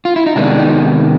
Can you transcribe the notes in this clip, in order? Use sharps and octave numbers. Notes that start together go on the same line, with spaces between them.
F4
E4
D#4
C3 D#3 G#3 B3 D4
D#4